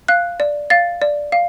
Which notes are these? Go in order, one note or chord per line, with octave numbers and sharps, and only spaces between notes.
F5 F#6
D5
F5 A6
D5
F5